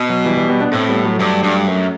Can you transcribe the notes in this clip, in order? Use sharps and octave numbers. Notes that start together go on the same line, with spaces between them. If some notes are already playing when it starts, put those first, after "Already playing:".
Already playing: B2
F#3
E3 G3
E3 G3
G3 B3
B3 D4
A2 A3 C4
G3 B3
F#3 A3
G2
G2
F#2